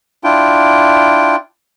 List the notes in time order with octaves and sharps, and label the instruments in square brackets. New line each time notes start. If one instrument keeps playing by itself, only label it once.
[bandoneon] D4 E4 F4 G5